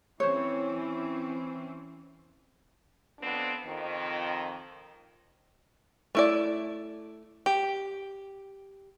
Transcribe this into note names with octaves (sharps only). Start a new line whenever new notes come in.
E3 C4 C#4 C5 C#5
F2 B3 C4 D4
F2 D#3
A3 E4 D5
G4